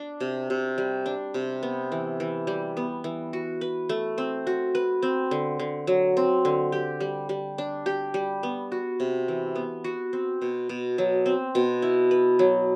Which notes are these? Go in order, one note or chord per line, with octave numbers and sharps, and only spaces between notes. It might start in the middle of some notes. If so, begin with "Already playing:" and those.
Already playing: D4
C3
C3
G3
D4
C3
B3
E3
E3
G3
B3
E3
F#4
B4
A3
C4
F#4
B4
C4
D3
D3
F#3
C4
D3
G4
G3
G3
D4
G4
G3
B3
F#4
C3
E3
B3
F#4
C4
B2
B2
F#3
C4
B2
E4
B4
F#3